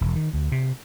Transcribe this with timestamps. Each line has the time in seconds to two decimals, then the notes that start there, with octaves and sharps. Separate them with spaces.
0.01 E1
0.16 D#3
0.33 D2
0.52 C3